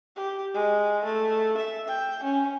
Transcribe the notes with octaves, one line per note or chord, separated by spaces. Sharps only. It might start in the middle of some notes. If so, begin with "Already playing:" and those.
G4
G#3
A3
E5
G5
C#4